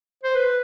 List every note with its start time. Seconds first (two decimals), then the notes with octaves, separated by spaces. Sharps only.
0.23 C5
0.35 B4